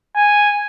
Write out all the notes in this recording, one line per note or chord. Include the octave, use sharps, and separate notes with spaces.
G#5